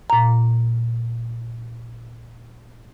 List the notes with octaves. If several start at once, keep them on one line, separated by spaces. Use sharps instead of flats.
A#2 A#5